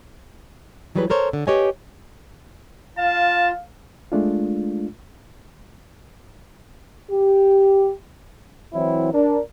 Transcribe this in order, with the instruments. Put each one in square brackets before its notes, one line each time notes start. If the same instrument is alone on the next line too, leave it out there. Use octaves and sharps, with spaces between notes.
[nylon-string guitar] E3 F#3 G3 G#4 A4 B4
A4 A#4 C5 C#5
D3
G4 B4 C#5 D#5 G#5
[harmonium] F4 [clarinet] F5 [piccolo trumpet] A5
[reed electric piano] G#3 A3 D4 F4
[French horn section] G4
[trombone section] E3 F#3 C4 E4
D4 A#4